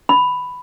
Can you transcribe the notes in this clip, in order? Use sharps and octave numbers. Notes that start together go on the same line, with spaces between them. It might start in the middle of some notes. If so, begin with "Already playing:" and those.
B5